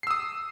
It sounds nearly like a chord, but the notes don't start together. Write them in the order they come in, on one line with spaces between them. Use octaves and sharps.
C7 E6 D#6